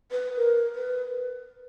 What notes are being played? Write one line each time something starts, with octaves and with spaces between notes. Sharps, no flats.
B4
A#4
B4